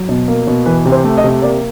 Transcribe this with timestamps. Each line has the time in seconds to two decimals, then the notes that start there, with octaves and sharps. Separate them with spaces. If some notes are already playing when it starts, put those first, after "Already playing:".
Already playing: F#3
0.09 B2
0.28 A#3
0.47 B2
0.66 E3 B4
0.85 C3
0.92 C5
1.04 A3
1.18 D#5
1.24 C3
1.42 A#3 D5